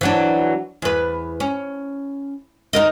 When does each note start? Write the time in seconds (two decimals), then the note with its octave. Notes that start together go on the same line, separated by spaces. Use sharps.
0.01 E3 F#3 D4
0.82 E2 B4
1.40 C#4
2.73 D#4 A#4 D#5